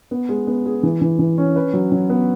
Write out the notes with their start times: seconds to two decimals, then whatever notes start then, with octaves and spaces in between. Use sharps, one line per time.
0.11 B3
0.29 G#3
0.47 B3
0.66 G#4
0.83 E3
1.01 E3
1.19 E3
1.38 C#4
1.56 B4
1.74 F#3
1.92 F#3
2.10 B3